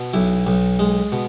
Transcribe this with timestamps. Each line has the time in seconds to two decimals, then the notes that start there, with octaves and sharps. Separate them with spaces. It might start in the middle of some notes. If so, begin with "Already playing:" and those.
Already playing: B2
0.14 B1 E4
0.47 B1
0.79 G#3
1.12 B2